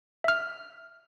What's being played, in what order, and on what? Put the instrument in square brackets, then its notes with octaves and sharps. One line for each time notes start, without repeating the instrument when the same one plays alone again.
[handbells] E5 F6